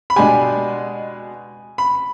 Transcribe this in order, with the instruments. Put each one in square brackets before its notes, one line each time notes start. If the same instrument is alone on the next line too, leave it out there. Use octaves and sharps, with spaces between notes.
[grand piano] B5
[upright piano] B2 G#3 D4 G4 [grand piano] G#5
[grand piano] B5